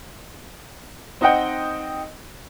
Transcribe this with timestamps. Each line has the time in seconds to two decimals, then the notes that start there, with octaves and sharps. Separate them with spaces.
1.21 C4 D#4 D#5 F#5 G5